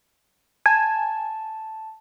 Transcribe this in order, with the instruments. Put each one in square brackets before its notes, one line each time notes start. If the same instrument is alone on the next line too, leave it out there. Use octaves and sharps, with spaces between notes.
[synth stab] G#5 [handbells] A5